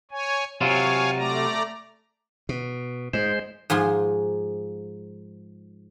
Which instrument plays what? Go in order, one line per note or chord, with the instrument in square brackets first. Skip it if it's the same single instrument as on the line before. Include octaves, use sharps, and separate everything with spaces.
[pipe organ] C#5 G#5
[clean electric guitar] C3 F#3 F4 [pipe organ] C#5 F5 G#5
[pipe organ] A3 D5 A#5
[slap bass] B2
[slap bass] G#2 [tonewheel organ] G#3 C5
[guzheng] G#2 F3 G#4 C6